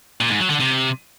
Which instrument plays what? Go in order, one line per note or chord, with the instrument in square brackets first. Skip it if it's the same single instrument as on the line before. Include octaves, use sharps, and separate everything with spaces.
[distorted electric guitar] A#2
G#2
F#3
D3
C3